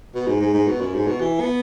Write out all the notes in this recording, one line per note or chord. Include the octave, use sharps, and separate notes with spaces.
B2
G#2
G#2
G#2
B2
F#2
G#2
B2
E3
B3